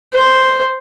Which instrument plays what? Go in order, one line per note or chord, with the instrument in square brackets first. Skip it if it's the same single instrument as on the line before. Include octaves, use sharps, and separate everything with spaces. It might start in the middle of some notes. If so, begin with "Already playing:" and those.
[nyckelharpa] C5